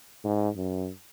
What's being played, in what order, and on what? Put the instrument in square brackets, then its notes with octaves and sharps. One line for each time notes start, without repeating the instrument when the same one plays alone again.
[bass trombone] G#2
F#2